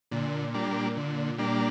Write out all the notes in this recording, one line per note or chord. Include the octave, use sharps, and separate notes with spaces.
A#2 D3
G3 A#3 D4
D3
G3 A#3 D4